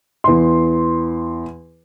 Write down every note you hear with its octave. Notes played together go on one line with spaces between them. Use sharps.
E2 C6